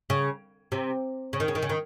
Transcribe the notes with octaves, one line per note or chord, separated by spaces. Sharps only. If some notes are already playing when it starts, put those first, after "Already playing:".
C#3
C3
C#3
D#3
C#3
D#3
C#3
D#3